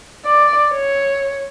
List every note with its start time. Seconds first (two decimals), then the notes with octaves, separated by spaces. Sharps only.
0.26 D5
0.72 C#5